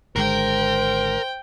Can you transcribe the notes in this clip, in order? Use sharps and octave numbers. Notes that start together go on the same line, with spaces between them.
G#1 D3 G#3 A#4 C5 G5